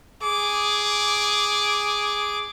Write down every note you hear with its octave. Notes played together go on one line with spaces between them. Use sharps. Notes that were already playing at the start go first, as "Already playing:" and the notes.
G#4 D6